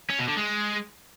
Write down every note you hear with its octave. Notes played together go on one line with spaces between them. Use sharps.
C#4
B2
D3
G#3